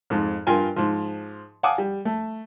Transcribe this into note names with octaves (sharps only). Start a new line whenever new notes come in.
F2 G#2
G2 F4 A#4 G5 G#5
G#2 F3
F5 F#5 G#5 A5 D6 D#6
G3
A3